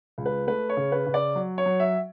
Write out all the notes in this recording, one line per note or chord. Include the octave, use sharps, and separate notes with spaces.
C#2
B4
A3 B4
C#5
C#3
B4
C#3
D5
F#3
C#5
F#3
E5